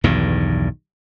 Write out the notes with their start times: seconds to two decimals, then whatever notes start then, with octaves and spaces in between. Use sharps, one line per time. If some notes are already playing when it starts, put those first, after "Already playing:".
0.04 B1 E2 G2 D#3